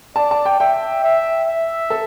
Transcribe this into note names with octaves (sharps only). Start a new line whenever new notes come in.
D5 A5
A5
G5
E5 G5
E5
E5
A4